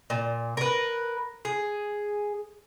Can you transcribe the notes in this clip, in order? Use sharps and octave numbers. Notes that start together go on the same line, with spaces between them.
A#2
A#4 B4
G#4